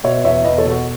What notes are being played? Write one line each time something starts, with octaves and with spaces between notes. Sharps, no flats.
B2 C#5 E5
E2 C#5 E5
E2 B4 D#5
A4 C#5
B2
F#4